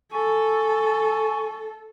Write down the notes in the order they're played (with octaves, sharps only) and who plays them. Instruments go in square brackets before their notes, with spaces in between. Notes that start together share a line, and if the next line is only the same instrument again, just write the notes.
[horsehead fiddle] A4 [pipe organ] G#5 C#6